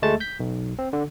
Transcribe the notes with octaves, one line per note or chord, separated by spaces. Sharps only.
D2 G#3 A3 A5 A6
G6 B6
B1
C4
D3